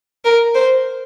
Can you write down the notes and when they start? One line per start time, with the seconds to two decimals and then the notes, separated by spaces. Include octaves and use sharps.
0.25 A#4
0.55 C5